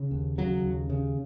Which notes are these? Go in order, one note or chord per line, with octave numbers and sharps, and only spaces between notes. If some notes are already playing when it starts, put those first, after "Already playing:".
Already playing: C#3
D#2
C#3 F#3
D#2
C#3